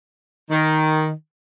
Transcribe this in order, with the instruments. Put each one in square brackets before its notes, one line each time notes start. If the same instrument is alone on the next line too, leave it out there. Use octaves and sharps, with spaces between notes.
[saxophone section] D#3